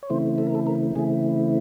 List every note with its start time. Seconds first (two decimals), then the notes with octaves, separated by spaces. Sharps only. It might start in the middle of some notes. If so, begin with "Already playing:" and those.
0.03 C#5
0.10 C#3 E3 A3 C4 E4 C5
0.38 A4
0.47 A#4
0.55 A4
0.67 A#4
0.96 C#3 E3 A3 C4 E4 G#4